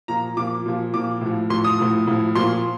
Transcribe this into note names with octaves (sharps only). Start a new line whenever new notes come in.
A#2 F3 A#5
A#2 F3 D6
A#2 F3
A#2 F3 D6
A2 F3
A2 F3 C6
D#6
A2 F3
A2 F3
A#2 F3 C6